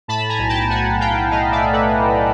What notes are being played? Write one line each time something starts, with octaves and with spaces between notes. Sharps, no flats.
A2 A5 B5
G#5 A#5
B1
G5 A5
B1 F#5 G#5
B1 F5 G5
A3 D#5 F5
D5 E5
A2
A4 B4